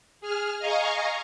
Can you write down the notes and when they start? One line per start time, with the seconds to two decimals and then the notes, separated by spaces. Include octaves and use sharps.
0.21 G#4 F6
0.59 D#5 F5 G#5 A#5 C#6